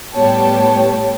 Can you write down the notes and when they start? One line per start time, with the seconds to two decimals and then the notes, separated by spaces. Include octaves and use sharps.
0.14 A2 G3 B3 C#5 G5 A5